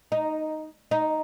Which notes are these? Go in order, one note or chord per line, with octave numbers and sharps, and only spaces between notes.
D#4
D#4